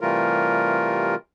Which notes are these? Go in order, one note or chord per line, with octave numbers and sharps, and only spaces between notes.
C3 E3 G3 A3 F4 A#4